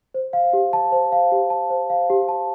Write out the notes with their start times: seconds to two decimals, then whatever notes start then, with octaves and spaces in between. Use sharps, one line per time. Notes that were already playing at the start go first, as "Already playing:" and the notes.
0.14 C5
0.33 F5
0.53 G4
0.73 A5
0.92 C5
1.12 F5
1.32 G4
1.50 A5
1.70 C5
1.90 F5
2.10 G4
2.28 A5